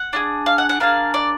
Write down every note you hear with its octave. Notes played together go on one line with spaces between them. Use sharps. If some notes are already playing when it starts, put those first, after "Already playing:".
Already playing: F#5
D4 F4 G#4
F5
F#5
F#5
A#3 D4 G#4 F5
D5